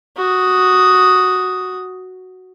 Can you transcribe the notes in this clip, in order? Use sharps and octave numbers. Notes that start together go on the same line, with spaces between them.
F#4 D#6